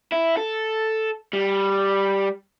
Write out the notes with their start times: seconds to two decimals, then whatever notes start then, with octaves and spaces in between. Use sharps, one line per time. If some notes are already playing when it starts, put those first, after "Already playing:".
0.12 E4
0.37 A4
1.33 G3